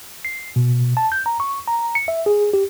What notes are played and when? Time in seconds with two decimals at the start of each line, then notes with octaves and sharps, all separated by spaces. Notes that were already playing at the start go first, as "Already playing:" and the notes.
0.25 C7
0.56 B2
0.97 A5
1.12 G6
1.26 A#5
1.40 C#6
1.68 A#5
1.95 C#7
2.08 E5
2.26 G#4
2.53 G4